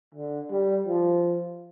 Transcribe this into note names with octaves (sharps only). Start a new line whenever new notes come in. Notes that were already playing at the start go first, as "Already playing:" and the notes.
D3
G3
F3